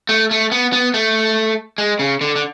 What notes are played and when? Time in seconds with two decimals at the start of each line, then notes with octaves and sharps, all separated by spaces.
0.09 A3
0.31 A3
0.51 B3
0.73 B3
0.94 A3
1.78 G#3
1.99 C#3
2.21 D3
2.36 D3